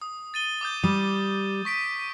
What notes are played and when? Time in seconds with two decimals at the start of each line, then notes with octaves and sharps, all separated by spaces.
0.02 D#6
0.34 A6 D#7 G7
0.61 D6 D#6 G6
0.84 G3 D#6
1.65 C#6 B6 D7